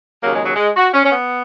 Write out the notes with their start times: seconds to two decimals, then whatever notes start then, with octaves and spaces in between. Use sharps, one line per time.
0.22 D#2 C#3 F#3 A#3
0.34 G#3
0.44 F#3
0.56 G#3
0.77 F#4
0.94 C#4
1.05 C#4
1.12 B3